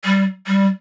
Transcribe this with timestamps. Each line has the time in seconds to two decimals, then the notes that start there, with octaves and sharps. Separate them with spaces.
0.04 G3
0.47 G3